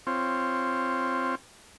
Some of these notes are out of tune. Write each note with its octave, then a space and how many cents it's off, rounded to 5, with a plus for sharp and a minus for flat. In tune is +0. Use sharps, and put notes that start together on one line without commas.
C4 +0 F4 -15 C#5 +0